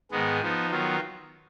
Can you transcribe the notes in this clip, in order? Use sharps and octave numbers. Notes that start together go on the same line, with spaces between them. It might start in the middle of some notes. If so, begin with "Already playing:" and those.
G#2 D#3 G#3 B3
F3 B3 D#4
D#3 F#3 B3 F4